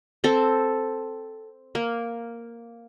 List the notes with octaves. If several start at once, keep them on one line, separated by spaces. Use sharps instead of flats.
C4 A4
A#3